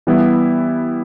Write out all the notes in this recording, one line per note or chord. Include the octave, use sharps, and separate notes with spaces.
E3 G3 B3 E4